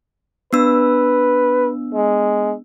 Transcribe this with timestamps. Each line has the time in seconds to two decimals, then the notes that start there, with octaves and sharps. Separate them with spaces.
0.53 B3 D4 B4 E6
1.94 G#3